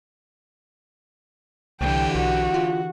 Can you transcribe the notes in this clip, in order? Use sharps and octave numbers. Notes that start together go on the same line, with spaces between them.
C2 D3 E3 G4 G5
B1 F#4
F4